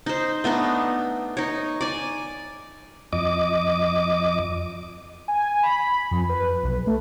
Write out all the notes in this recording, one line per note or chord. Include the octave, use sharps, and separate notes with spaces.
D#4 C5
A3 B3 D4 D#4
D#4 C#5
D5 G#5
F2 D#5 D6
G#5
B5
F2
B4
B1
A3